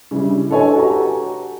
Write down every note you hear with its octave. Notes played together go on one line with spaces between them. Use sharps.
C#3 G3 D4 E4
D4 A4 B4 C#5 G#5
F#4 G4 A4 A#5